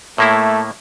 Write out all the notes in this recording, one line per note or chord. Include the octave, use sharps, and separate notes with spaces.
A2 A3 A#3 E4